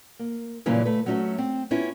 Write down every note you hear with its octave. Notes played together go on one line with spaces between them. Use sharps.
A#3
F#2 A#2 C#3 E3 G3
A3 B4
F#3 A3 C#4 F#4 E5
C4
B3 C#4 E4 F4